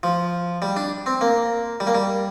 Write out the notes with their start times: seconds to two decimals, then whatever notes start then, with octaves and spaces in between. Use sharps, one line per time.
0.03 F3
0.62 G3
0.77 D4
1.06 C4
1.21 A#3
1.80 G3
1.87 A#3
1.95 G3